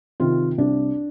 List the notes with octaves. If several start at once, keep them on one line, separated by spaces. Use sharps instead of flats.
C3 D#3 F4
C2 D4